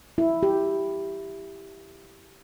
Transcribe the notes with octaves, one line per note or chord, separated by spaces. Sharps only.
E4
G4